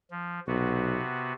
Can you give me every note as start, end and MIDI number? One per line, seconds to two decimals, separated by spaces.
0.11 0.40 53
0.47 1.01 35
0.47 1.33 48
0.47 1.33 59
0.47 1.33 66